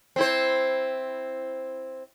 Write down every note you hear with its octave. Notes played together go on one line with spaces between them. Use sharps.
C4 E4 C5